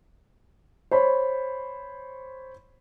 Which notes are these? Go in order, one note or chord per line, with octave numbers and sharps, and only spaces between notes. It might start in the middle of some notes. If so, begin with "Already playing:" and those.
C5 C#5 B5